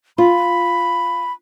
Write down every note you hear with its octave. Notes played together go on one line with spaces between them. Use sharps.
F4 B5